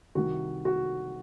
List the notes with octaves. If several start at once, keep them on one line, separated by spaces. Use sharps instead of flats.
C2 C3 D#3 F#4
F#4